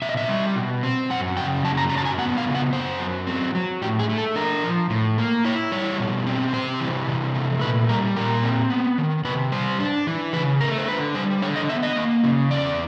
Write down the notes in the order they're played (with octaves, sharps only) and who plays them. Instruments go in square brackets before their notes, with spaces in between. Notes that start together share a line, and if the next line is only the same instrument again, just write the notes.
[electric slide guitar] B2 E5
D#5
E5
G3
B2
C4
F#2 F#5
C#3 G5
F#2 A5
A#5
F#3 A#5
A5
G#5
B3 F#5
F5
C#3
F#5
F#2 C5
F#3
C4
F#3
A2 G4
G#4
A3
A4
D4 A#4
F3
A2
A#3
E4 C#5
G3 C#5
B2
C4
C3 C5
E3
C3
A3
A#2 B4
G3 A#4
A#2 A#4
C4
B3
D#3
C3 B4
G3 C5
D4
E3
C#3 B4
A3 A#4
C5
D3 B4
G3 C5
D3 C#5
D#5
B3 E5
D#5
A#3
C#3
E2 D5